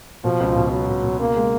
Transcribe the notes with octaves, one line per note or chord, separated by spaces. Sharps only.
B2 F3
C#2
B2
F#3 B3
B2
B2
C#3 A#3
G#3